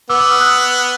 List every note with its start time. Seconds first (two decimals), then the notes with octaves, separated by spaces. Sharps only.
0.10 B3 D6 E6
0.20 D6 E6
0.31 D#6 F6
0.41 E6 F#6